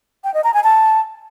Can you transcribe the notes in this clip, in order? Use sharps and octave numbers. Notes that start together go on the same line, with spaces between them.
G5
D#5
A#5
G#5
A5